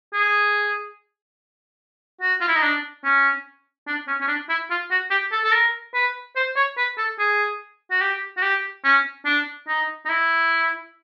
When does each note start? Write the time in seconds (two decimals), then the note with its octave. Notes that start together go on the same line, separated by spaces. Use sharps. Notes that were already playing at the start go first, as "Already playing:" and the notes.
0.14 G#4
2.21 F#4
2.41 F4
2.48 E4
2.56 D#4
2.63 D4
3.04 C#4
3.87 D4
4.08 C#4
4.21 C#4
4.28 D4
4.49 E4
4.70 F4
4.91 F#4
5.11 G4
5.32 A4
5.44 A4
5.53 A#4
5.94 B4
6.36 C5
6.57 C#5
6.77 B4
6.98 A4
7.19 G#4
7.91 F#4
8.01 G4
8.37 F#4
8.43 G4
8.84 C#4
9.26 D4
9.68 D#4
10.06 D#4
10.09 E4